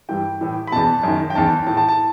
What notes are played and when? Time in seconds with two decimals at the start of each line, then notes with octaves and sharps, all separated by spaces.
0.09 G2 E3 G5
0.41 A2 E3
0.67 B5
0.72 E2 B2 A5
1.03 F#2 D#3
1.30 G5
1.35 E2 D#3 A5
1.67 A2 E3 A5
1.77 A5
1.88 A5